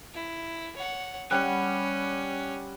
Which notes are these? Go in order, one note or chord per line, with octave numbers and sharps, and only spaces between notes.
E4
C#5 F#5
G3 C#4 F#5